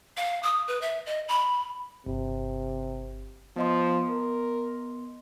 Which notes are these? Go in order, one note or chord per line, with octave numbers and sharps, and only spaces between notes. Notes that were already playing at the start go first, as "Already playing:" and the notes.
F5
D#6
B4
E5
D#5
B5
G1 C3
F3 B3 D#5 C6
A#4